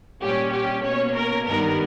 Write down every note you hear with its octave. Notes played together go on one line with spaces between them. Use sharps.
A#2 G3 C#4 G4
G4
B2 A#3 C#4 C#5
A#4
G2 D#3 G3 B3 A#4